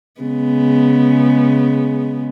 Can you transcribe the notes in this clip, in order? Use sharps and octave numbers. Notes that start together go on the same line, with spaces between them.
C#3 G#3 B3